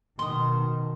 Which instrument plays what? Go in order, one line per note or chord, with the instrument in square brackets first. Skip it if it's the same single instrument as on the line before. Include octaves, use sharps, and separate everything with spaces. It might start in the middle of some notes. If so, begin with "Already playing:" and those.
[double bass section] B2 D#3 [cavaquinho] C6 D#6